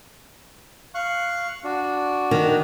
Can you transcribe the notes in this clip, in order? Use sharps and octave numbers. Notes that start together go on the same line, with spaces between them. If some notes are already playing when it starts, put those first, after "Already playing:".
F5 C#6 F#6
D4 F#4
D#3